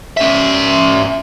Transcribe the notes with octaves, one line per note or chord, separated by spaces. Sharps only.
C#4 E5